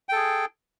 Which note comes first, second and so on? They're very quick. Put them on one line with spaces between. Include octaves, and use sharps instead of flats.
G5 A4 G#4